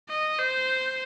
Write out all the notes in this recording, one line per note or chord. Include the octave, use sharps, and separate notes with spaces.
D#5
C5